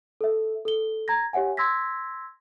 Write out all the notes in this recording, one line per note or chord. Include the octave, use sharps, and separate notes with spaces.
A4 E5
A4 G7
A#5 G#6 A#6
G4 C#5 E5 F#5 G#5
C6 E6 G#6 A#6 B6